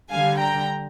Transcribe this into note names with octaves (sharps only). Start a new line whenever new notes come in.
D3 G3 F5 G#5
G5 A#5